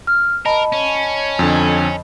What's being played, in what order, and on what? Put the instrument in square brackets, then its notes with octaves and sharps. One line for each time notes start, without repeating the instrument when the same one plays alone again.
[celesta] F6
[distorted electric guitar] A#4 [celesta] D#5 A5 B5
[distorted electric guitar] C#4
[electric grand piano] F2 D3